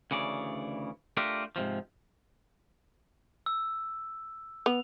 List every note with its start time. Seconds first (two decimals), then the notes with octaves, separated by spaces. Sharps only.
0.11 D2 C#3 E3 D5
1.17 A3 D4 F4 G4 A4 A#4
1.56 G#2 C3 F3
3.46 E6
4.66 B3 F7